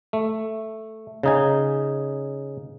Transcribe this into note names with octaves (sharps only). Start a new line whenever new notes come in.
A3
C#3 D#4 G#5